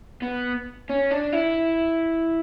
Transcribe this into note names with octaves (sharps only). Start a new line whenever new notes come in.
B3
C#4
D4
E4